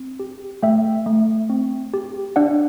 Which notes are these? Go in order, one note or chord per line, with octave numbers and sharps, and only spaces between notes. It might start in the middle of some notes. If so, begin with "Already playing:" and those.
Already playing: C4
G4
A3 E5 G5
A3
C4
G4
D4 D5 F#5